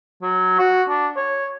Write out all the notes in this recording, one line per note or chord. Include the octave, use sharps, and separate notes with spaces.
F#3
F#4
D4
C#5